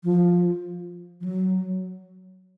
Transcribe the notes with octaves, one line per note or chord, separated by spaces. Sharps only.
F3
F3
F#3